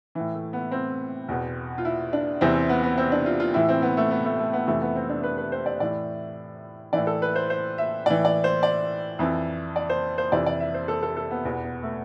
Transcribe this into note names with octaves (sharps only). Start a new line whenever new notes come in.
A2 E3
A3
B3
C4
E2 B2
F4
E4
D4
E2 C3 E3 C4
B3
B3
C4
D4
F4
F4
A2 E3 E4
C4
B3
A3
B3
A3
A3
B3
F2 C3 E3 A3
B3
C4
D4
B4
B4
C5
D5
A2 E3 D5
A2 E3 D5
A4
B4
C5
C5
E5
A2 E3 D5
D5
C5
D5
F2 E3
D5
C5
C5
F2 C3 E3 D5
D5
E5
C5
A4
A4
A4
B3
E2 B2 B3
B3
A3